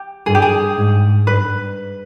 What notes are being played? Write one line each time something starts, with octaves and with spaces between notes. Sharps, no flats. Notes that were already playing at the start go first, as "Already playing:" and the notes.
Already playing: G4
G2 G#4
G4
G#4
G#2
G2 B4